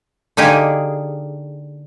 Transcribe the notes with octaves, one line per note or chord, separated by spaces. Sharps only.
D3 A#3 D#4 G4 G#4